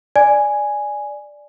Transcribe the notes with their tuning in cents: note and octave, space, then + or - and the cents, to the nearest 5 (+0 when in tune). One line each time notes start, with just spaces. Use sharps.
D5 +0 G#5 +0